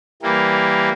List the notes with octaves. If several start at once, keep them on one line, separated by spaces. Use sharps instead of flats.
E3 G3 A#3